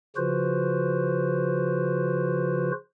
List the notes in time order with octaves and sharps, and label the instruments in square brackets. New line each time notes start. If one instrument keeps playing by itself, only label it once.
[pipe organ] C#3 F3 F4 F#4 B4 C5